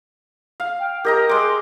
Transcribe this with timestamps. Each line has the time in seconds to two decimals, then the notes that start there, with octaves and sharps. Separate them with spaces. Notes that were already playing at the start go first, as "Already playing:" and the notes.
0.60 F5
0.80 G5
1.05 G4 A#4 D#5 A#5
1.29 G#3 C6 D6